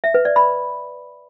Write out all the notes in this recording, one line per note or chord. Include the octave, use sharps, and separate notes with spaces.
E5
B4
D5
B5